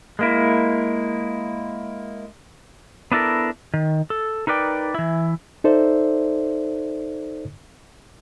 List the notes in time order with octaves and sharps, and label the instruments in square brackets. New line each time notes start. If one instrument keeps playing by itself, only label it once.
[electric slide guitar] G#3 A#3 E4
B3 D4 E4 A4 A#4
D#3
A4
D#4 A#4 B4 D5 G5
E3 E4
[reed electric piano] D#4 A4 C5 D5 E5